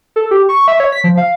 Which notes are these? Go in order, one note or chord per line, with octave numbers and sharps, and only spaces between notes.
A4
G4
C#6
E5
C#5
B6
F3
F5